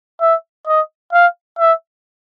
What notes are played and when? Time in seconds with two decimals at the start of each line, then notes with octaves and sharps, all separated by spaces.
0.21 E5
0.67 D#5
1.13 F5
1.59 E5